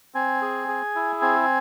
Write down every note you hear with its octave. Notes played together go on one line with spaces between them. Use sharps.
C4 G#5
G#4
G#4
E4
C4 G#5